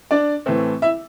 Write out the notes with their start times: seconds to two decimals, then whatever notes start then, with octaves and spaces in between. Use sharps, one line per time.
0.11 D4 D5
0.46 A2 E3 A3 C4
0.82 E4 E5